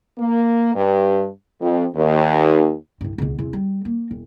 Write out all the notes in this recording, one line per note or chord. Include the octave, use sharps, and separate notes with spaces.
A#3
G2
F2
D#2
C2 G2
C#2 B2
E2 C3
G3
A#3
E1